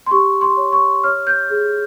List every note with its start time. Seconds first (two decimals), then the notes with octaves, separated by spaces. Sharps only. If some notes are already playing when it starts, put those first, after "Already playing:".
0.06 C6
0.11 G4 C#6
0.41 C6
0.57 C#5
0.72 C#6
1.04 C#5 F6
1.27 G6
1.50 G#4